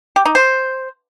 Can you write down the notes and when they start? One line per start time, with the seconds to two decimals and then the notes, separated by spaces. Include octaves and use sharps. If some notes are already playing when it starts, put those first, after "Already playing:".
0.16 G4
0.25 D#4
0.35 C5